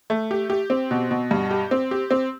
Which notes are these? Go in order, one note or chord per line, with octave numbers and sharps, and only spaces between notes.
A3
G4
G4
C4
B2
B2
G2
G4
C4
G4
C4